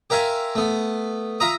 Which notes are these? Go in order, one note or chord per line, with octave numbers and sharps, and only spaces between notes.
G4 A#4 E5 F5 G#5 C6
A3 B3
F4 E5 A#5 D#6